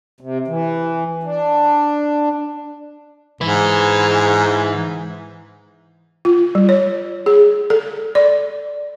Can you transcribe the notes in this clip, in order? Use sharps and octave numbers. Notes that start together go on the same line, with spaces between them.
C3
E3
D4
G#2 E3 B4
F4
G3
C#5
G#4
A4
D5